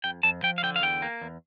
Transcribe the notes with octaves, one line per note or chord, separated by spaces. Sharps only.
F2 G5
F2 A5
F3 G5
F5
D3 G5
F5
E2 G5
A#3
E2